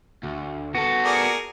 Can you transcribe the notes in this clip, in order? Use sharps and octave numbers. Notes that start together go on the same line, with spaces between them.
D2
B3 F#4 A4
G#4 A#4 D5